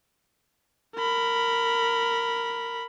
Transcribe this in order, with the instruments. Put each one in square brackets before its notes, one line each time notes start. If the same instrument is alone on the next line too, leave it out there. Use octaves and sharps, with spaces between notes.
[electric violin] A#4 B5